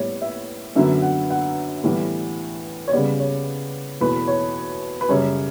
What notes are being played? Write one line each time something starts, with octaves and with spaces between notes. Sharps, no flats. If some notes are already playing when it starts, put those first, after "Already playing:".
Already playing: A2 G3 B3 C#5
E5
F#2 D3 F#3 B3 E5
F#5
F#5
A2 E3 G3 B3
C#5
C#3 G3 B3 D5
C#5
E2 B2 A3 B4
C#5
B4
F#2 C#3 G3 C#5